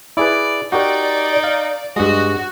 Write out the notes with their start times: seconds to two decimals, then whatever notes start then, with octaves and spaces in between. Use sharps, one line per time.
0.17 E4 G#4 B4 D5
0.72 D#4 F#4 G4 A#4 D5
1.44 F5
1.96 G2 G#3 F#4 D#5